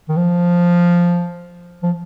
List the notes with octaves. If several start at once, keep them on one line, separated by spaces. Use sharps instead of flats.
D#3
F3
F3